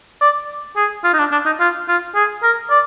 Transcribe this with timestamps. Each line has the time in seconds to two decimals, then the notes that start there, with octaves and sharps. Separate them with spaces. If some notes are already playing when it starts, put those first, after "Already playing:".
0.21 D5
0.76 G#4
1.04 F4
1.14 D#4
1.19 D4
1.32 D4
1.46 D#4
1.60 F4
1.88 F4
2.15 G#4
2.43 A#4
2.70 D5